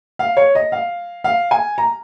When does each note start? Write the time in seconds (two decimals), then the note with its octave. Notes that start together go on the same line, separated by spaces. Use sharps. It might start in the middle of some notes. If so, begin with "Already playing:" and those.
0.19 F5
0.37 C#5
0.55 D#5
0.72 F5
1.24 F5
1.51 G#5
1.78 A#5